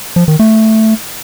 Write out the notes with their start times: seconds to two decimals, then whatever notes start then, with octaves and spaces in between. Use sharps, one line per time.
0.16 F3
0.28 D#3
0.39 A3